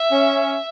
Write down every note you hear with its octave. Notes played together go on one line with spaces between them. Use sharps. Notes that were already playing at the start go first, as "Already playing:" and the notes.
Already playing: E5
C#4